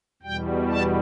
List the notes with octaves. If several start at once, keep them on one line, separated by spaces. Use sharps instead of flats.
E2 B2 G3 G5
A5